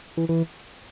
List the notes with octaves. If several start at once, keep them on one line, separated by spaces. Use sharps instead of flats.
E3
E3